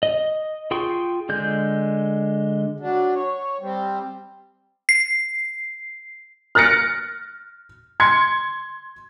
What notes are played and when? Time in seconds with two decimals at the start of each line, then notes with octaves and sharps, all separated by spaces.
0.03 D#5
0.71 F4 G#4 G5 C6 C#6
1.29 D3 G#3 G6
2.80 F#3 D4
3.14 C#5
3.61 G3 C4
4.89 C7
6.55 F6 F#6 A6 A#6 C#7 D7
8.00 C6 G#6 C#7